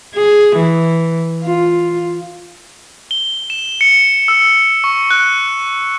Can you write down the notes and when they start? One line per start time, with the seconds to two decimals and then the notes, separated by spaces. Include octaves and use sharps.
0.15 G#4
0.56 E3
1.44 F4
3.11 G7
3.50 E7
3.81 C#7
4.28 E6
4.84 C#6
5.11 F#6